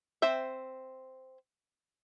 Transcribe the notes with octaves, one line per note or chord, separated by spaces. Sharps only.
C4 C5 E5